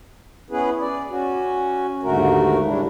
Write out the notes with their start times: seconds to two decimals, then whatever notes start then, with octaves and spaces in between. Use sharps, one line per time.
0.50 B3 C#4 E4 G#4 B4
0.80 D5
1.10 C#4 F#4
2.03 D#2 G#2 D3 A3 F#4 A#4
2.66 C#3 G3 D4 E4